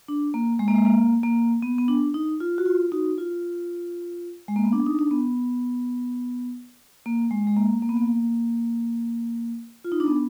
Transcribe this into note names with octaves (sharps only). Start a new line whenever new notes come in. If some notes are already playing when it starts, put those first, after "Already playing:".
D4
A#3
G#3
A#3
G#3
A#3
A#3
B3
B3
D4
D#4
F4
F#4
F4
D#4 F#4
F4
G#3
A#3
B3
D4
D#4
D4
B3
A#3
G#3
G#3
A#3
A#3
B3
A#3
F4
D#4
D4
B3